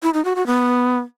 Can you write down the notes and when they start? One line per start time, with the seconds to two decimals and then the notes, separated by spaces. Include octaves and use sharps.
0.03 E4
0.14 D#4
0.25 F#4
0.36 F#4
0.47 B3